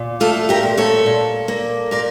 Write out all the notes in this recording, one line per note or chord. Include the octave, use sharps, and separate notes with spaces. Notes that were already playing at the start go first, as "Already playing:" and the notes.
Already playing: A#2
A3 F4 A4
G4 A#4
A#2
A4 C#5
A#2
A#3
A#2 A#4 D5